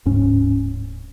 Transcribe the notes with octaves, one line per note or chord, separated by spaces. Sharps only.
D1 G#2 C#4